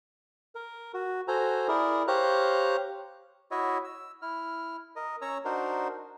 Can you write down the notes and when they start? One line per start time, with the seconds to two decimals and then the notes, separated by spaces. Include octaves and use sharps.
0.55 A#4
0.94 F#4
1.28 F#4 A4 C5 G#5 A#5
1.68 E4 G#4 A#4 D5
2.08 G4 C5 C#5 F5 A#5 F#6
3.51 E4 F#4 C#5 D#5 E5
3.84 E6
4.22 E4 F6
4.96 A#4 D#5
5.22 C#4 C#5 A#5 E6
5.45 D4 D#4 F#4 A#4 C5